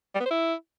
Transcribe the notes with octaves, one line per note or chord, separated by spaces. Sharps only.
G3
B3
C5
E4